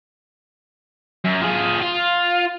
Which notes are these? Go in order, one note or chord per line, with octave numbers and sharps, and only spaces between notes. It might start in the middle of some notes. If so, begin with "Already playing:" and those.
F#2
F3 G#4
F4